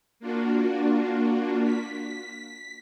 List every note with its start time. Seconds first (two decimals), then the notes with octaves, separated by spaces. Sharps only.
0.20 A#3 D4 F4 F#4
1.65 B6